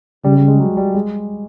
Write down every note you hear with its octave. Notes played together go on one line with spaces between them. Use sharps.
C#3 G3
G3
G#3
F#3
G3
G#3